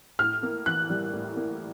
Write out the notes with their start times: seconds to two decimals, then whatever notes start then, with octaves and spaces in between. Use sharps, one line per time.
0.19 A2 F6
0.43 A#3
0.66 E3 F#6
0.90 G3
1.13 A2
1.36 A#3